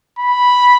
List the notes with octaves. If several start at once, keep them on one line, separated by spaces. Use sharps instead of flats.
B5